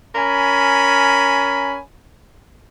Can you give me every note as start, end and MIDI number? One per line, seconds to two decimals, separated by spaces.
0.15 1.79 61
0.15 1.79 70
0.15 1.79 80
0.15 1.79 83